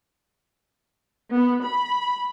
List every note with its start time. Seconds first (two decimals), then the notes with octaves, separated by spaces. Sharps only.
1.31 B3
1.64 B5